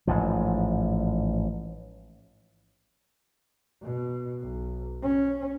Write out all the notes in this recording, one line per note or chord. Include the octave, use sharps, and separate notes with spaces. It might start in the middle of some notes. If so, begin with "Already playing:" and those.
A1 G#2 F3
B2
B1
C#4